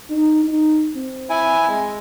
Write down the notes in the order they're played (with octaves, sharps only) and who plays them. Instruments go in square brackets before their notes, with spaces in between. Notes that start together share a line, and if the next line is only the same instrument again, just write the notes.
[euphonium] D#4
D#4
C4
[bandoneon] E4 G#5
G#3